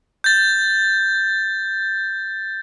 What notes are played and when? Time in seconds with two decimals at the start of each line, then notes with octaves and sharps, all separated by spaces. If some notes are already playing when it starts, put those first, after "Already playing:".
0.24 G6 A6